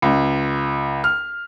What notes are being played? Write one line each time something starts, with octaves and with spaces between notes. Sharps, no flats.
C#2
F6